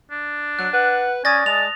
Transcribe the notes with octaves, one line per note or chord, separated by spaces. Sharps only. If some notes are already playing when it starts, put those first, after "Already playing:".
D4
F#3 F#6
B4 F#5
C#4 D5 G#5 D#6 A6 A#6
G#3 A5 F7